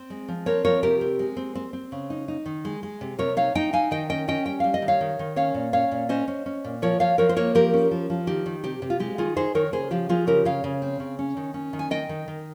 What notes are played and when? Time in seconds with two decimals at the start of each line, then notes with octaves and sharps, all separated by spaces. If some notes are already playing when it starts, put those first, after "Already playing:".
Already playing: C4
0.10 G#3
0.28 F3
0.46 C4 A#4 C#5
0.65 F3 A#4 C#5
0.83 C3 G4 A#4
1.01 C4
1.19 G#3
1.37 C4
1.55 C4
1.73 C4
1.92 C#3
2.10 D#4
2.28 D#4
2.46 D#3
2.65 G#3
2.83 G#3
3.01 C3
3.19 C3 A#4 C#5
3.37 D#4 C#5 F5
3.55 D#4 D#5 G5
3.73 D#4 F5 G#5
3.91 D#3 D#5 G5
4.09 C#4 D#5 G5
4.28 C#4 D#5 G5
4.46 G3 G5
4.60 G3 F5
4.74 D#5
4.82 D#3
4.88 C#5 F5
5.01 D#3
5.19 D#3
5.36 C#4 C#5 F5
5.54 A#2
5.73 C#4 C#5 F5
5.91 A#2
6.09 C#4 C5 D#5
6.28 C#4
6.46 C#4
6.64 A#2
6.82 F3 A#4 C#5
7.00 F3 C#5 F5
7.18 F3 A#4 C#5
7.29 C5
7.36 A#3 A#4 C#5
7.55 F3 G4 A#4
7.74 C#4
7.91 F3
8.10 F3
8.27 D#3 G4
8.46 D#3
8.64 C3 G4
8.82 C3
8.90 F4
9.00 G#3 G4
9.18 D#3 F4 G#4
9.36 D#4 G#4 C5
9.55 D#3 A#4 C#5
9.73 C#3 G#4 C5
9.91 F3 G4
10.09 F3 F4 G#4
10.27 C#3 G4 A#4
10.45 C#3 C#5 F5
10.64 C#3
10.82 C4
11.00 C#3
11.19 C#4
11.37 D#3
11.54 C#4
11.73 D#3
11.79 G#5
11.91 D#3 D#5 G5
12.09 D#3
12.28 D#3